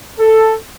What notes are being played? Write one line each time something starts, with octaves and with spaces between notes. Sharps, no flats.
A4